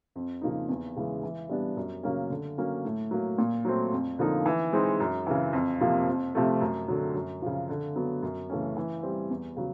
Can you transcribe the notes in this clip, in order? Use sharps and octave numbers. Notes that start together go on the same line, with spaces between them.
F2
C#3 F3 A#3 D#4
E2
C#3 E3 G#3
E3
G3 B3 D4
F#2
C#3 F#3 A#3 C#4
D3
F#3 A#3 C#4
A2
F#3 A#3
A#2
F#3 A3 C4
F2
D3 F3 A#3 D#4
E3
G#3 C4 D#4
F#2
C#3 E3
F2
C3 F3 A#3
F2
C3 F3 A3
F#2
D3 F#3
F#2
C#3 F3
D3
F#3 B3
F#2
C#3 E3 A3 C#4
E3
G3 C4
E2
C#3 F#3